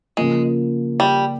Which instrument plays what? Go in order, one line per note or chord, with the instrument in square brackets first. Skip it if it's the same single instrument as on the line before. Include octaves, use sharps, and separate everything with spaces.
[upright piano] C#3 F3 A#3 [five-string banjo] G#3
[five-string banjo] G3